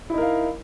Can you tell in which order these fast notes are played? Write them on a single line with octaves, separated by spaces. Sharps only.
E4 D#4 A#4 F5